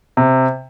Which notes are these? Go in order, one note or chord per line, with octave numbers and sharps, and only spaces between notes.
C3